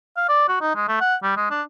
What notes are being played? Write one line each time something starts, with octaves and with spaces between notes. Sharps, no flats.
F5
D5
F#4
D#4
G#3
A3
F#5
G3
G#3
D4